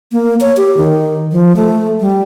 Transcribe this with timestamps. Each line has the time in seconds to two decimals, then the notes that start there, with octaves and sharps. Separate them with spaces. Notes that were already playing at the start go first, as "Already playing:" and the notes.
0.12 A#3
0.41 C#5
0.57 G4
0.77 D#3
1.32 F3
1.56 A3
2.00 G3